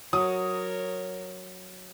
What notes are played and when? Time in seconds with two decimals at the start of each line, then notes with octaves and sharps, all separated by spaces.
0.13 F#3 A#4 C#5 D#6